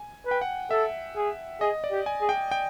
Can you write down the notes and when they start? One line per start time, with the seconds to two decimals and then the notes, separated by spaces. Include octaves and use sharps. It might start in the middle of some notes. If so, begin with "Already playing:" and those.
Already playing: G#5
0.26 B4
0.31 G5
0.41 F#5
0.71 A4 E5
1.16 G#4
1.61 G#4 D#5
1.84 D5
1.91 G4
2.06 G#5
2.21 G#4
2.29 G5
2.51 G5